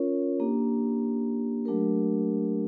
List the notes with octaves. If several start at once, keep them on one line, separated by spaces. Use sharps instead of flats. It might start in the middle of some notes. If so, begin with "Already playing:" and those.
Already playing: C#4 F4 A#4 C#5
A#3 D4 G4
F#3 A3 D4 G4 A#4